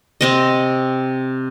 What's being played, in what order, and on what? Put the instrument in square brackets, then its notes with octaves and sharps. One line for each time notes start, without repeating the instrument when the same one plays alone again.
[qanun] C3 C4 D#5